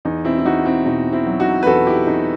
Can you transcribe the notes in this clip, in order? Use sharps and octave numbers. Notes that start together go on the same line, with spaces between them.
E2 D#4
C4 E4
E4
E2 D#4 F#4
C4 E4
B2 D#4
C4 E4
F#3
D#4 F#4
B4
E2 F#4 A4
E4 G4
E2 D#4